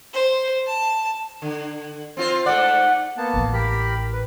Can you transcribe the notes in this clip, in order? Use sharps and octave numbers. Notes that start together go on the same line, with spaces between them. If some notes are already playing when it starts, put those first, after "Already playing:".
C5
A5
D3
C4 F4 C5
G#2 A3 D5 F#5
A#3 B3 A5
A1 E3
G4 A#4 B5
B4